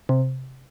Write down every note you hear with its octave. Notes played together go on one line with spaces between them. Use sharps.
C3